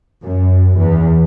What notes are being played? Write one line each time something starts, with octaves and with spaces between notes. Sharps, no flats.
F#2
E2